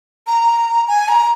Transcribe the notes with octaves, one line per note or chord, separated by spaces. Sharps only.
A#5
G#5
A#5